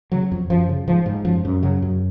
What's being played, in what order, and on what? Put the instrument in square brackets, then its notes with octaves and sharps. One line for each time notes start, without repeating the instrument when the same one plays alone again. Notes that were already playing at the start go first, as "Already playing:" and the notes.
[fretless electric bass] C#3 F#3
F2
F#2 F3
C#3
G#2 F3
G#2
F#2 F3
F#2
C#3 F#3
F#2